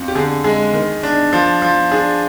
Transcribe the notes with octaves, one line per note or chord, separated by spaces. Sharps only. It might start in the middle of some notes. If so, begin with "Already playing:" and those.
Already playing: F2
G4
D3 G#4
G#3 G#4
D#3
D4
F3
F3
D4 G#4